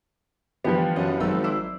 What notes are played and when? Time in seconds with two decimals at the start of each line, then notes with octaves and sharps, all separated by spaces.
0.64 D3 E3 F3 G3 B3 G4
0.96 F#2 D#5 F#5
1.20 G#1 F#3 D#4 E6
1.44 E4 C5 D5